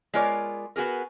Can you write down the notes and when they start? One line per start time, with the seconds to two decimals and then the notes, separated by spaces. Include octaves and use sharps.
0.14 G#3 B3 F4 A#4 C#5 D5
0.76 B3 F#4 G#4 A#4